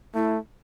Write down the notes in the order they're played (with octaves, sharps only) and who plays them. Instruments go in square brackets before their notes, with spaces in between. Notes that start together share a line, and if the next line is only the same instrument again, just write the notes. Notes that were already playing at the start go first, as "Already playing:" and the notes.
[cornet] A3 [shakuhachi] E4